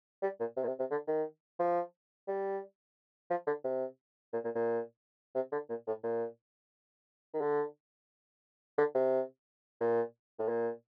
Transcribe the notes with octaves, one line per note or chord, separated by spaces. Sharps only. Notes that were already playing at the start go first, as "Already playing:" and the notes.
G3
A#2
C3
A#2
C3
C3
D3
D#3
F3
G3
F3
D3
C3
A#2
A#2
A#2
C3
D3
A#2
A2
A#2
D#3
D3
D3
C3
A#2
A2
A#2